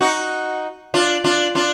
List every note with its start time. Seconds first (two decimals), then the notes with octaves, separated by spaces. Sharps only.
0.01 D#4 F#4
0.94 D4 F4
1.24 D4 F4
1.55 D4 F4